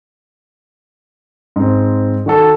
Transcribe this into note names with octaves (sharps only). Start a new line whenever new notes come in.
G#2 C4
D#3 F#4 A4